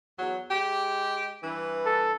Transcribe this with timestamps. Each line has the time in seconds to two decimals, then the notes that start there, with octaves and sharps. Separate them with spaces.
0.19 E2 F#3
0.51 G#3 G4
1.42 G2 E3
1.86 A4